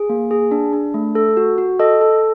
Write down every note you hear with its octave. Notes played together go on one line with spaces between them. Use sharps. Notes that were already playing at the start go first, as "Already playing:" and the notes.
Already playing: G#4
A#3
G#4
D4
D4
A3
A4
F#4
F#4
A4 D#5
A4